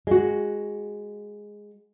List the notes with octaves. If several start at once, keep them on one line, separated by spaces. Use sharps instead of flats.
G#3 F#4